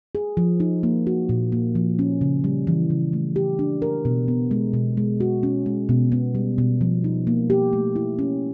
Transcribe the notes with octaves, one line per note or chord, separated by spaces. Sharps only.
G#4
F3
D#4
A#3
F#4
A#2
A#3
F3
C#4
C#3
G3
E3
C#3
A3
G4
D4
A#4
B2
B3
G#3
B2
G#3
F#4
C#4
G#3
B2
B3
G3
B2
F3
D#4
A#3
G4
A3
E4
C#4